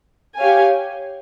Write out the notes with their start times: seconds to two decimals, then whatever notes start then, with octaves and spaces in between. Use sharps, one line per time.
0.38 G4 C#5 F5 G#5